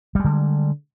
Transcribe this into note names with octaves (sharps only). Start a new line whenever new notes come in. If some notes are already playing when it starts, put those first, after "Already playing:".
D3 G3 G#3